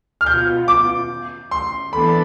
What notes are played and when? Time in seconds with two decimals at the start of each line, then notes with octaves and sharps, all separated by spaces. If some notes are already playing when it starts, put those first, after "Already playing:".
0.21 F6
0.26 B2 B3 F4 G6
0.68 D6
1.51 C6
1.93 E3 B3 D4 A4 B5